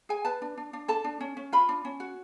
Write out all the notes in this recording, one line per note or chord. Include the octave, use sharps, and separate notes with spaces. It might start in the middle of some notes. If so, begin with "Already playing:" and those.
G#4 G#5
B4 A5
D4
D4
D4
A4 A5
D4
C#4
C#4
F4 B5
D4
C#4
F#4